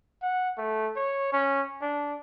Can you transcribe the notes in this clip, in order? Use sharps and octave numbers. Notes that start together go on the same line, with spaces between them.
F#5
A3
C#5
C#4
D4